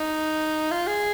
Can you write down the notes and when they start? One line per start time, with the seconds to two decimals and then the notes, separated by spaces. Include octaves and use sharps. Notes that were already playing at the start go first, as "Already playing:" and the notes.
Already playing: D#4
0.71 F4
0.87 G#4